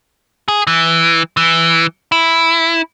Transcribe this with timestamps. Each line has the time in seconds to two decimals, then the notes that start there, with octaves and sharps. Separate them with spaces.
0.48 G#4
0.67 E3
1.37 E3
2.12 E4